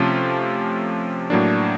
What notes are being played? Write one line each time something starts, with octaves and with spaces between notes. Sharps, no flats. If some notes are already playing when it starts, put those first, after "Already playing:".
Already playing: C3 F3 A3 C#4 F4
A2 F#3 A#3 D4